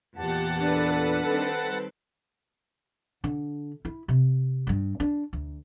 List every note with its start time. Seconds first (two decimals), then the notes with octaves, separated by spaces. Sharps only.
0.16 E2 A#2 G4 F#5 A5
0.59 D4 A4 B4
1.28 D#3 G3 C4
3.24 D3
3.85 E4
4.08 C3
4.67 G2 G3
5.00 D4
5.33 D2